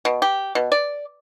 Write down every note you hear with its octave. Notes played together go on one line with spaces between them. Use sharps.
B2
G4
B2
D5